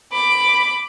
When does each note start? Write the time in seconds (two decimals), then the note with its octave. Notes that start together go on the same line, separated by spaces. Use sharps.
0.12 B5 D6